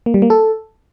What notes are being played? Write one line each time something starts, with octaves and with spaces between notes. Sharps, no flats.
A#3
G3
A#3
A4